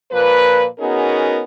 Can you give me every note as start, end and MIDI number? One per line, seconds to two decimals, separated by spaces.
0.12 0.65 46
0.12 0.65 53
0.12 0.65 58
0.12 0.65 71
0.79 1.42 59
0.79 1.42 61
0.79 1.42 63
0.79 1.42 66
0.79 1.42 68
0.79 1.42 70